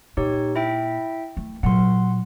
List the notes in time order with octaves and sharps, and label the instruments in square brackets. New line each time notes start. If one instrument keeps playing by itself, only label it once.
[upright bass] A#2 [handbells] D#4 G4 C#5
[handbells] E4 E5 G5
[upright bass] A3
[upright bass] A#2 F#3 [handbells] F#5 C6